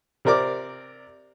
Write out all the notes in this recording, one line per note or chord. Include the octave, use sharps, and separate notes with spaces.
C3 C4 A#4 D5 D6